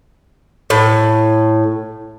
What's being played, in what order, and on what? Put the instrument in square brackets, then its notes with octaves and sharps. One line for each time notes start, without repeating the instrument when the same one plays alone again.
[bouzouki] A2